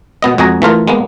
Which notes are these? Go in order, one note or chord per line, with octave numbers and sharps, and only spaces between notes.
B2 B3 D#5
F2 G#3 F#4 G#4 A#5
E3 A3 F4 A#4
G#3 A#3 B3